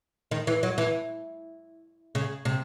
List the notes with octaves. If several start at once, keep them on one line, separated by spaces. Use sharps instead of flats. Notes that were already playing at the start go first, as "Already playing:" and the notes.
D#3
E3
F#3
E3
C#3
C3